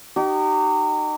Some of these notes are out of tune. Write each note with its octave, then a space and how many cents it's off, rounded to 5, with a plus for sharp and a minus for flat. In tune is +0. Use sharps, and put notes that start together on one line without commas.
D#4 -30 G4 -40